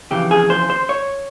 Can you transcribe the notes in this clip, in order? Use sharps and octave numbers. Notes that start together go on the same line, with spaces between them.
F2 C#3 E3 G4
G#4
C5
C5
C#5